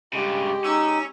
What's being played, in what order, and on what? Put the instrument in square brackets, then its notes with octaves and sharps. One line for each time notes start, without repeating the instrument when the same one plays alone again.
[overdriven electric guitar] G2 C#3 [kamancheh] G#3 G4
[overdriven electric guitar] C#4 [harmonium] D#4 [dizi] E6